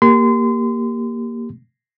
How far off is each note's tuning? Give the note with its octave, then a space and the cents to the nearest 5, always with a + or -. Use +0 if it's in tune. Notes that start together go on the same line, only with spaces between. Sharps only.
A#3 +0 G4 +0 C6 -30